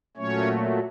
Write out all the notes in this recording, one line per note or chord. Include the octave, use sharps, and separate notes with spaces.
A#2 F#3 A3 C#4 C#5